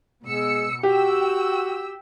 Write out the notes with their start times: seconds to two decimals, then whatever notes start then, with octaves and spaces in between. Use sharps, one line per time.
0.24 B2 G#3 E6 C#7
0.83 F#4 G4 G5 E6